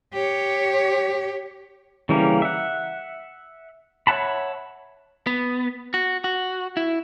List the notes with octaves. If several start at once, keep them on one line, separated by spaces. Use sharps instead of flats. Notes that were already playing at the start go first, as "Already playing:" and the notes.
G4 C#5
C#3 E3 G3 A#3 C#4
E5 F#5
C#5 E5 F#5 A5 B5
B3
F#4
F#4
E4